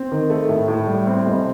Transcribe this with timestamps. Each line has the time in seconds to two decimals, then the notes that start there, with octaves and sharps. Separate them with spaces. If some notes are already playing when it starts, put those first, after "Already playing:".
Already playing: C4
0.12 D#3
0.30 A3
0.49 A2
0.68 A2
0.88 G3
1.07 C4
1.26 F1